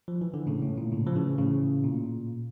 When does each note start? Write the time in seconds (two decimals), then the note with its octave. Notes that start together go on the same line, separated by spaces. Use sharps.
0.08 F3
0.21 E3
0.34 D3
0.47 A2 C#3
0.62 A2
0.77 A#2
0.92 A2 C#3
1.07 F3
1.16 C#3 E3
1.38 A2 C#3
1.84 A#2